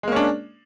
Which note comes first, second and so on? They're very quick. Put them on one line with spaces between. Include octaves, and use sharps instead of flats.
G#3 A#3 C#4 D4